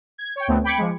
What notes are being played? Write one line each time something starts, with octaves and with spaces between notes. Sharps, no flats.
G#6
C#5 G5
D2 A3 B3 C4
G5 B5 D6 G#6 C#7
F3 G#3